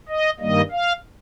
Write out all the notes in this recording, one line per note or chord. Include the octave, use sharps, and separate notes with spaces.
D#5
G2 D#3 G3 A#3 D#5
F5